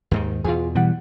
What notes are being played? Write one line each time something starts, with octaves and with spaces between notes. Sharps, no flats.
D#2 G#2 D#3
E2 B2 F4 G#4
B2 E3 G3 F#5